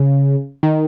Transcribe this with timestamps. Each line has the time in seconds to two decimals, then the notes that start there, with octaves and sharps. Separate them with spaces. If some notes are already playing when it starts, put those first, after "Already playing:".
Already playing: C#3
0.63 D#3